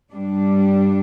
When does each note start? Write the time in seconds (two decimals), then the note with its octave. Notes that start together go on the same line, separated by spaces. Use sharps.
0.11 G2 G3 D4